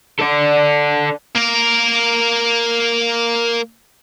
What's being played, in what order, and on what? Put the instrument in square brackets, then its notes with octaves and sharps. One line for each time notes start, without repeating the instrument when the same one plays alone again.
[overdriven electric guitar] A4 D5
[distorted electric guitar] A#3 A#4